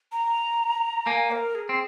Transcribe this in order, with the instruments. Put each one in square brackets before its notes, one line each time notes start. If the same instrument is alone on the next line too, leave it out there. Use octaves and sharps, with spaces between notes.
[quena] A#5
[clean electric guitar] A#3 [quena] G#5
[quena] A#4
G#4
[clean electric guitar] C4